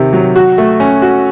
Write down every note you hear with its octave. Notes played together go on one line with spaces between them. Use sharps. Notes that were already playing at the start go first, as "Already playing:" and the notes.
Already playing: C3 D#3
F#3
F#4
A3
C#4
F#4